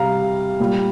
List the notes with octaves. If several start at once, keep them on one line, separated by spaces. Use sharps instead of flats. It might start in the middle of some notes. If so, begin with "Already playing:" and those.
Already playing: C3 G3 F5 A#5
A#2 G3